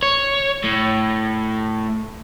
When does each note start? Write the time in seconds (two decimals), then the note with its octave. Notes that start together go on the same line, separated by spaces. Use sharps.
0.03 C#5
0.64 A2